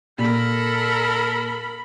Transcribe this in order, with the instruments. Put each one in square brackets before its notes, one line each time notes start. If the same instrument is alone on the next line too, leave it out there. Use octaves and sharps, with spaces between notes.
[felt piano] A#2 [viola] A4 A#4 [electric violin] B5